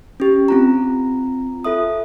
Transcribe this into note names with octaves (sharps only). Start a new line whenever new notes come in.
C#4 G4
C4 F4 A#5
F4 A4 E5 D#6